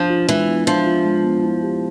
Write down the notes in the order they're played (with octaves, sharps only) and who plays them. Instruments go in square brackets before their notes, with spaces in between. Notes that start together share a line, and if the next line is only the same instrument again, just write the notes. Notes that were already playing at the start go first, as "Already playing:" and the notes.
Already playing: [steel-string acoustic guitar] F3 [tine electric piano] D4
[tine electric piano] F4
[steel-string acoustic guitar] E3 [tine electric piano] G#3
[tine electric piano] B3
[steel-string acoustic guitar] F3 [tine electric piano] D4
[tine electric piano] F4
G#3
B3
E4
G4